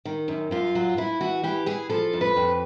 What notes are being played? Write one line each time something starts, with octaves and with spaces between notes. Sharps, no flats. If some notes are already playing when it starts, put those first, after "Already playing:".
D#3
F#2
F#2 F4
F#3
E3 E4
E3 F#4
E3 G4
E3 G#4
F3 A4
F2
B4
F2